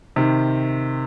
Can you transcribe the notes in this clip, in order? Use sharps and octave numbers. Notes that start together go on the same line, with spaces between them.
C3 D#3